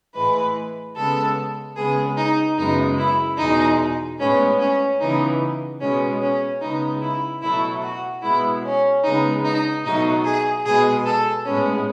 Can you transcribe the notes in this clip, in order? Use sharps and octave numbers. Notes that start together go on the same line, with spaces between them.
A2 E3 G#3 B4
C#3 G#3 B3 A4
C#3 G#3 B3 G#4
D#4
F#2 C#3 G#3 B3 D#4
E4
E2 B2 G#3 D#4
A2 G#3 B3 C#4
C#4
C#3 E3 B3 D#4
B2 G#3 B3 C#4
C#4
C#3 G#3 B3 D#4
E4
B2 F#3 A3 E4
F#4
B2 G#3 B3 E4
C#4
C#3 G#3 B3 D#4
D#4
B2 F#3 A3 D#4
G#4
B2 G#3 B3 G#4
A4
A2 G#3 B3 C#4